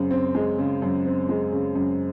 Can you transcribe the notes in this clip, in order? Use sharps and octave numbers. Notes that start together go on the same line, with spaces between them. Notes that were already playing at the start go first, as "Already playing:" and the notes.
Already playing: F#2 C#3 C4
C4
G#3
C#3
F#2
C4
G#3
C#3
F#2